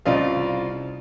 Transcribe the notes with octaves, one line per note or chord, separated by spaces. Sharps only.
C2 C#3 F4 D5 D#5 F5